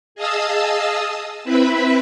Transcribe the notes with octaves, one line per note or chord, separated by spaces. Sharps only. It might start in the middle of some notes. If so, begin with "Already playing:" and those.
G#4 D#5 F5 A5 D#6 E6
C4 E4 B4 E5 B5